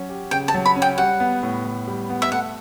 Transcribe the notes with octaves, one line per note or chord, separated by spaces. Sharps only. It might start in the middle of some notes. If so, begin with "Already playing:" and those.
Already playing: F#3 C#4
G4
C#3 G5
A5
F#3
B5
C#4
G5
G3 F#5
B3
A2
A2
G3
B3
E5
A3 F#5